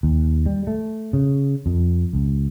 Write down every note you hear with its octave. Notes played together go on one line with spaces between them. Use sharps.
D#2
G3
A3
C#3
F2
C#2